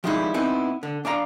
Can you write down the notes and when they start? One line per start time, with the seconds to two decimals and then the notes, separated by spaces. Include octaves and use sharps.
0.04 F3 G3 G#3 C#4 D#4 E4
0.34 B3 C4 D#4 E4
0.83 D3
1.05 D4 D5 F5 A#5